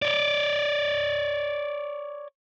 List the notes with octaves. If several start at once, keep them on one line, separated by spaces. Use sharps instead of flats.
C#5 D5